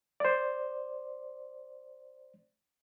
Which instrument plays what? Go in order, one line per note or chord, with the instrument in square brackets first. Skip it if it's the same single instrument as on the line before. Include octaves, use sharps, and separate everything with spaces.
[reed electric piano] C5 D5